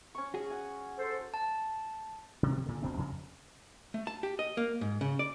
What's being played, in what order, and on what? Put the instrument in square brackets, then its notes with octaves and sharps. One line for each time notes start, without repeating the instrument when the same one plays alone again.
[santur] C#4 C#6
[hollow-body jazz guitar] F#4 G#4
[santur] F#5 G#5
[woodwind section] A4 C5
[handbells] A5
[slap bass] C3 D#3
A#2 D3
D#1 B2 C4 D4
F2 C#3
[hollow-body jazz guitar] A3
A5
G4
D#5
A#3
G#2
C#3
D5